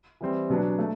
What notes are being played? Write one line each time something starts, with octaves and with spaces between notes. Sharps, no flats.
E3 G3 C4
B2 F#3 B3 D4
A3